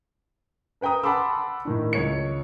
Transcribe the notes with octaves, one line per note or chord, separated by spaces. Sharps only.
A#4 B4 G5 A#5 D#6
F#5 A5 B5 C6 D6 E6
A2 D#3 D4
C#2 C#5 C#7